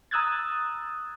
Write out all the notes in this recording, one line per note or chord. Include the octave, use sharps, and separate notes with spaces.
A#5 D#6 E6 F#6 G#6 A6